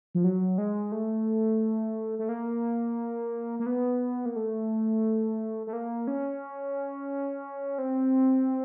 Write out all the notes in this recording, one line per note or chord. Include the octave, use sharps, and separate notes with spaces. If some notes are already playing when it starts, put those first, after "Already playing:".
F3
F#3
G#3
A3
A3
A#3
A#3
B3
A#3
A3
A3
A#3
C#4
C4